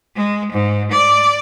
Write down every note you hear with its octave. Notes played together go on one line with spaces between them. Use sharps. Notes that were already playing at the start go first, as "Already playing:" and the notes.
G#3
G#2
D5